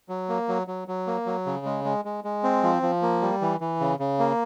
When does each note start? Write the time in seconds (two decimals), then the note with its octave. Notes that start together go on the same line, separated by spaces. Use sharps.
0.09 F#3
0.29 A#3
0.48 F#3
0.67 F#3
0.88 F#3
1.07 A#3
1.26 F#3
1.46 C#3
1.66 G#3
1.84 G#3
2.05 G#3
2.24 G#3
2.44 C4
2.63 F3
2.82 F3
3.02 A#3
3.22 G3
3.41 E3
3.61 E3
3.80 C#3
3.99 C#3
4.19 A#3